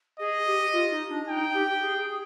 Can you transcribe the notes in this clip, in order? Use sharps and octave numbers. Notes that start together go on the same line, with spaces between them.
G#4 D#5
G4
F4
D#4
D4
D#4 G5
G4
G#4
G#4
G#4